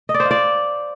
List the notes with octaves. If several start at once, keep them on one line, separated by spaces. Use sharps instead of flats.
D#5
D5
C5
F5
D5